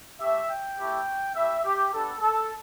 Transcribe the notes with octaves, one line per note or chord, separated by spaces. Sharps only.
A3 G4 E5
G5
A3 E4 G4
A3 E4 G4 E5
G4
B3 D4 G4 A4
A4